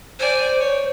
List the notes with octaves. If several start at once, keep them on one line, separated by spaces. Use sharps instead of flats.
C5 D5 G#5
C#5